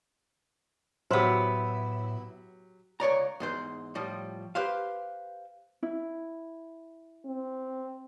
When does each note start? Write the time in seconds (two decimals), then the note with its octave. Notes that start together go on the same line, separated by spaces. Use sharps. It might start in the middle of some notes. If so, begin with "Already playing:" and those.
1.11 A2 F#3 B3 E4 G4 C5 C6
3.00 C#2 C#5 D5 A#5
3.40 E2 G#2 C5
3.95 A2 F3 G3
4.55 G4 B4 C5 F5
5.83 E4
7.26 C4